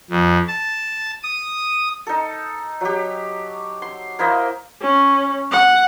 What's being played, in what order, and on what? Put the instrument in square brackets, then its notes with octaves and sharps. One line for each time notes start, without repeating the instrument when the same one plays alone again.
[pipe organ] F2
A5
D#6
[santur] D#4 A4
F#3 G4
C6
A#3 E4 C5 D#5
[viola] C#4
F#5